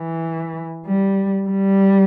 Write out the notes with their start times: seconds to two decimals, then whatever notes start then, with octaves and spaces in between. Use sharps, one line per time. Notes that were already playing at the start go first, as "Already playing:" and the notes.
Already playing: E3
0.86 G3
1.49 G3